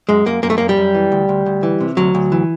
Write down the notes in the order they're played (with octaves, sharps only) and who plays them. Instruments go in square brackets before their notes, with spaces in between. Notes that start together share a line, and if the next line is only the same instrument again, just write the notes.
[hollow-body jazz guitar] F#2 G#3
F#2 A#3
F#2 A#3
A3
F#2 A#3
G3
F#2
E3
D2
D2
D2
E3
C3
D2 F#3
D2
E3